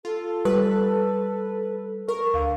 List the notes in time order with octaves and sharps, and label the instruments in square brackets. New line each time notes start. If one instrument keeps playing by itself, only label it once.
[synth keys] F4 [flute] A4
[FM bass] G3 [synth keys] B4
[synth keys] A#4 [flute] C#6
[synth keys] D2 [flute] F5